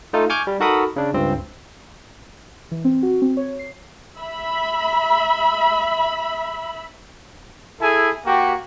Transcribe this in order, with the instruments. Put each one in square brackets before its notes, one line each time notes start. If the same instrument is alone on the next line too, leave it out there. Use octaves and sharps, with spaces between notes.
[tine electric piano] A3 D#4 F4 A4
G#5 C#6 D6 F6 G6 G#6
G3
D#4 F#4 A4 A#4 B5 D#6
C#3 D4
C#2 G2 C4
[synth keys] E3
C4
F#4
C4
C#5
C7
[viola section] E5 B5
[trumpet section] E4 G#4 A4 G#5
A#3 F#4 G4